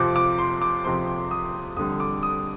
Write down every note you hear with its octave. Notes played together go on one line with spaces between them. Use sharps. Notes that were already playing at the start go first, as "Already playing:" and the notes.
Already playing: F2 C3 F3 C4 D6
D6
C6
D6
F2 C3 F3 C4 C6
D#6
F2 D3 G3 D#6
D6
D#6